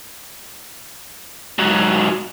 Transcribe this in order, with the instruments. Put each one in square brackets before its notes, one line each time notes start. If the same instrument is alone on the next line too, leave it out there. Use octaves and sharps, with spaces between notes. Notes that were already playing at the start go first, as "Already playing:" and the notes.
[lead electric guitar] G#2 F#3